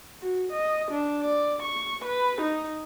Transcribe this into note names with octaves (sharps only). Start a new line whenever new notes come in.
F#4
D#5
D4
D5
C#6
B4
D#4